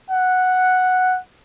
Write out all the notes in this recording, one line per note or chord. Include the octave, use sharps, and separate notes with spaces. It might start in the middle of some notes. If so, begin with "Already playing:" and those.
F#5